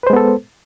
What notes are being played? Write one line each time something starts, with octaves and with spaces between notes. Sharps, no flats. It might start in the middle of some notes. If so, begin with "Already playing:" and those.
G#3 B3 A4 B4 C5